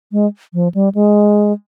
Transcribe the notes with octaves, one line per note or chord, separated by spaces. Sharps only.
G#3
F3
G3
G#3